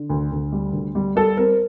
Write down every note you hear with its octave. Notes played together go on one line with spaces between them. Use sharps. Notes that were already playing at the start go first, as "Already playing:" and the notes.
Already playing: D3
D2
D2
G3
D2
G3
G3 A4
C4 A#4